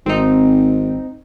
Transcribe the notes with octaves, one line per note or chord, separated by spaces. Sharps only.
G#1 C4 D#4